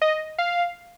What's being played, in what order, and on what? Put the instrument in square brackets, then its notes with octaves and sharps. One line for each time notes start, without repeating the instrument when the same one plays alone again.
[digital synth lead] D#5
F5